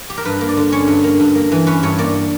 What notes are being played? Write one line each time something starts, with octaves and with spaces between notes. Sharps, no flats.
G4
A#4
G2 B4
A#3
D5
D3
C#4 C#5
G2
A#3
G2
A#3
E3
C#4 B4
G2 C#5
A#3 D5